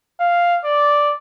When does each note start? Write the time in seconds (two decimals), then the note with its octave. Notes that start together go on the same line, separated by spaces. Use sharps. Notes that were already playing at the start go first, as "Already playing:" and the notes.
0.20 F5
0.64 D5